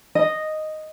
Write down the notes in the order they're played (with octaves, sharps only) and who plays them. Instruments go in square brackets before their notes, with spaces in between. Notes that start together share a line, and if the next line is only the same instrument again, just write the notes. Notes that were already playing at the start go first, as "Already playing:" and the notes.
[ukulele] D#5